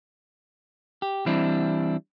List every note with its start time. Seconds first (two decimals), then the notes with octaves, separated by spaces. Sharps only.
1.02 G4
1.26 E3 G3 C4 D4 E4